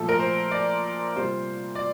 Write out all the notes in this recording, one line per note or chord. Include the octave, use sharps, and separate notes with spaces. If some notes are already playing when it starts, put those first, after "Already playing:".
Already playing: A#2 F3 A3 A4
A#4
C5
D5
C3 G3 A#3 F4 C5
D5